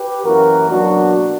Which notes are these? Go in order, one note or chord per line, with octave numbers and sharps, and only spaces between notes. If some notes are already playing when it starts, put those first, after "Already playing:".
Already playing: G4 B4
F#2 E3 A#3 F#4 A#4
B2 F#3 A#3 D4 F#4